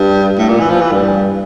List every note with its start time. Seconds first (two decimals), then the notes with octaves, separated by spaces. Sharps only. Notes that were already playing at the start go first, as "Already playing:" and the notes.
Already playing: G2
0.39 A2
0.49 A#2
0.60 E3
0.70 F3
0.81 E3
0.92 G2